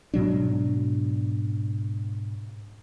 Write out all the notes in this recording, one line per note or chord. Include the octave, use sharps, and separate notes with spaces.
G#2 B2 F#3 D4